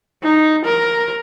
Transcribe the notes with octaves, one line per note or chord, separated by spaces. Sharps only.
D#4
A#4